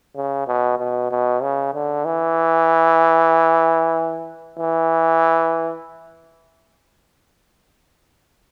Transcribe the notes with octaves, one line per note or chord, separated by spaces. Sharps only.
C#3
B2
B2
B2
C#3
D3
E3
E3